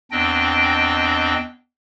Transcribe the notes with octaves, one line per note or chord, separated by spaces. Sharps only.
E2 C4 D4 D#5 G5